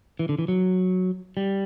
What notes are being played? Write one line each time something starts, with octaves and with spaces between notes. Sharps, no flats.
E3
D3
E3
F#3
G3